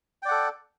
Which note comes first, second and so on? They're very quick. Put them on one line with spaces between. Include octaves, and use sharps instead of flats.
G5 D5 F#5 A4